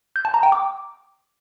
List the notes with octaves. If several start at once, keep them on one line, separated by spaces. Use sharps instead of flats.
G6
A5
A#5
G5
D6